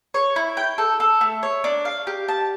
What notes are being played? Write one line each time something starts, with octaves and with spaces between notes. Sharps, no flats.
C#5
E4
G5
A4
A4
A3
C#5
D4
F5
G4
A5